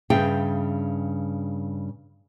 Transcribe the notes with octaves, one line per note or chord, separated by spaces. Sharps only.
G2 C#3 G#4 C5 E5 G5